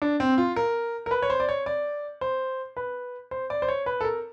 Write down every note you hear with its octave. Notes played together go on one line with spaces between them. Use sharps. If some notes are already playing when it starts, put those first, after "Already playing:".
D4
C4
F4
A#4
A#4
B4
C#5
C5
D5
C#5
D5
C5
B4
C5
D5
C5
C#5
B4
A4
A#4